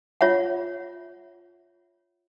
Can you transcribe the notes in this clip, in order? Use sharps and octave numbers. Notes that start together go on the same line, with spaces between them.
F4 C#5 E5 F#5